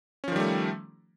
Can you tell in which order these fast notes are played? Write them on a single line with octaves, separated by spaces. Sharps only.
C#4 F3 D#3 G3 A3